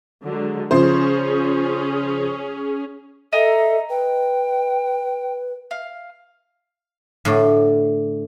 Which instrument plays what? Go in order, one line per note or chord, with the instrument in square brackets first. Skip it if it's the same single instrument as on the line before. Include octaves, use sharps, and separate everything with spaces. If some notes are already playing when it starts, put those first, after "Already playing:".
[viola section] D3 F#3 G#3
[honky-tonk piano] C#3 F3 C5 [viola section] C#4 G#4
[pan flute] A4 [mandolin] D#5 G#5 A#5 [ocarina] E5
[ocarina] B4 [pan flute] G5
[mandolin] F5
[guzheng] A2 D3 D5